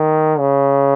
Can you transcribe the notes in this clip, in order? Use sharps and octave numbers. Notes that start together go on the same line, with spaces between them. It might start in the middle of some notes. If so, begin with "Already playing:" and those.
Already playing: D#3
C#3